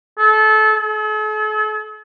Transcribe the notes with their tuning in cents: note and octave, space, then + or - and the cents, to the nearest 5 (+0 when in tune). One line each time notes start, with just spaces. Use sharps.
A4 -25
A4 -45